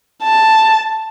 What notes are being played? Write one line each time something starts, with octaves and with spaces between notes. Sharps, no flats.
A5